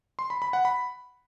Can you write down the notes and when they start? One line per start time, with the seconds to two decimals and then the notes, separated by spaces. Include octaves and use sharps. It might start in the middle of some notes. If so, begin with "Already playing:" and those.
0.19 C6
0.30 B5
0.42 B5
0.53 F#5
0.65 B5